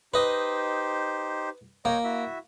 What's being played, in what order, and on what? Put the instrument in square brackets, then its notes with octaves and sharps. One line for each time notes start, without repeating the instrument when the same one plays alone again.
[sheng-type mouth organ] D#4 G4 C5 [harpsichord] B4 D#5
[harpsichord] A#3 [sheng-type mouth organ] C#5 D#5 G5
[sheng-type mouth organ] E4 F#4 E5